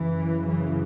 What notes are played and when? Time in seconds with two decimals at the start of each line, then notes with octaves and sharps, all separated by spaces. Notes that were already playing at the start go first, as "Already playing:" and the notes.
Already playing: F#2 C#3 E3
0.48 E3